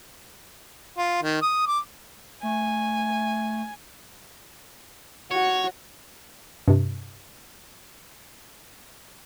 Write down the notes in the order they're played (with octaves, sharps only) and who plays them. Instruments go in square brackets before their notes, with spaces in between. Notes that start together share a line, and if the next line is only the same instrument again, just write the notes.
[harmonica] F4
D#3
D#6
D6
[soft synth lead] A3 [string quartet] G#5
[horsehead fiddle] F#4 [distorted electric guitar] C#5
[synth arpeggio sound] G2 C3